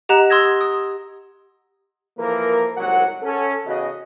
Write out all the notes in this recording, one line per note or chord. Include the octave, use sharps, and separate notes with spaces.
G4 D#5 F#5 A#5 F#6 E7
C6 D#6 E6 G#6 A#6
D#6
E3 F3 A#3 A4 A#4
C2 G#2 F#3 F#5
C#4 A4
E2 C#3 F#4 D#5